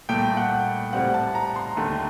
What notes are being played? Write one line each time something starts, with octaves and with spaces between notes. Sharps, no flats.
C2 A#2 A3 G5
F#5
A2 G3 C4 F#5
A5
A#5
C6
D#2 D3 A3